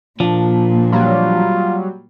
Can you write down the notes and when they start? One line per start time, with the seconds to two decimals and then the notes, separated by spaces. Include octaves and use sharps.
0.20 A#2 F3 D4
0.92 F#3 G3 F4